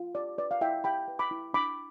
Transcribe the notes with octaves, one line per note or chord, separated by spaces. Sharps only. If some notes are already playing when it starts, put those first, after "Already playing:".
Already playing: F4
G4 D5
B4 D5
F5
E4 E5 G5
G4 G5 B5
B4
B5 D6
E4
D4 B5 D6